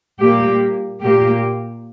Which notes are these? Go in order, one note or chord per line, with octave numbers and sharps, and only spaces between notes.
A#2 G3 A#3 G4
A#2 A#3 G4